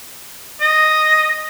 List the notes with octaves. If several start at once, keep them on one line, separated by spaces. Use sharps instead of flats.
D#5